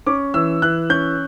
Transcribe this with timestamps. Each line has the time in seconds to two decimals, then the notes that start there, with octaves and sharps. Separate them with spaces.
0.07 C#4 D6
0.34 E3 E6
0.62 E3 F#6
0.90 C#4 G6